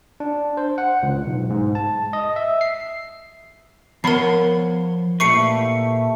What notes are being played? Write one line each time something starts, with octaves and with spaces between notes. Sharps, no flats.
D4
C5
F#5
C#2
B1
G#2
A5
D#5
E5
C7
F3 B3 A#4 C#5 F#5 B5 C7
A#2 A3 E4 G4 B4 C#6 C7 C#7